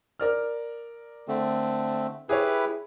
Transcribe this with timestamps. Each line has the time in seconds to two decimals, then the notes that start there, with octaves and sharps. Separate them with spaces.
0.20 A#4 D5 F6
1.28 D3 A3 C4
2.29 E4 G4 G#4 B4 C#5